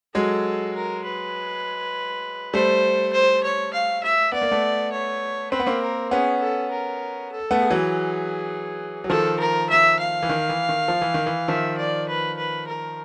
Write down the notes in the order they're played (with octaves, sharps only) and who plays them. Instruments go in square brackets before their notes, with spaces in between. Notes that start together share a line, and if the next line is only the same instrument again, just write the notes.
[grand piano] F#3 G#3 [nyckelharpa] A4
[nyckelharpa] A#4
B4
[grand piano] G3 A3 [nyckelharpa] C5
[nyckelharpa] C5
C#5
F5
E5
[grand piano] B3 [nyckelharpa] D5
[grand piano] A#3
A3 B3
[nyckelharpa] C#5
[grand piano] C4 [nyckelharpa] B4
[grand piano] B3
A#3 C4
[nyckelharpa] A#4
[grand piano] B3 C#4 [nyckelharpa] G#4
[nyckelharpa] A4
A#4
A4
[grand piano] A3 B3
[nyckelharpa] G#4
[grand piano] E3 F#3
F#3
[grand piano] D#3 F3 [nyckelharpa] A4
[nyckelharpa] A#4
E5
F5
[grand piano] E3
D#3
E3
D#3
F3
E3
D#3
E3
[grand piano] D#3 F3 [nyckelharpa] E5
[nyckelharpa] D5
B4
B4
A#4